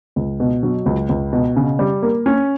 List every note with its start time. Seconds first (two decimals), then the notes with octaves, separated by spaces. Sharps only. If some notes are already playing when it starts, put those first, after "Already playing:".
0.16 C#2
0.40 B2
0.63 F#3
0.86 C#2
1.09 C#2
1.33 B2
1.56 C#3
1.79 G3
2.03 A#3
2.26 C#4